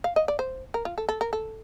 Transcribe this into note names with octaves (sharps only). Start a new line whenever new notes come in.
F5
D#5
D5
C5
A#4
F4
A4
A4
A#4
A4